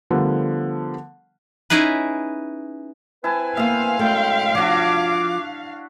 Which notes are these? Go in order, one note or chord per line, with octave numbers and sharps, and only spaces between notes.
D3 F3 G3 A3 B3 A#4
C#4 D#4 E4 G#4 B4
C4 E4 B4 G#5 A5
A#3 B3 C5 E5 F5
F#2 G#3 A3 G5
F3 D4 F4 F#4 C#5 D6